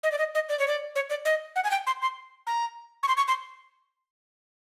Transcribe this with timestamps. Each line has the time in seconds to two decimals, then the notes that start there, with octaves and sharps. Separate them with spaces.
0.03 D#5
0.12 D5
0.18 D#5
0.35 D#5
0.49 D5
0.59 C#5
0.68 D5
0.95 C#5
1.10 D5
1.25 D#5
1.56 F#5
1.64 G#5
1.71 G5
1.87 C6
2.02 C6
2.47 A#5
3.03 C#6
3.08 C6
3.17 C#6
3.28 C6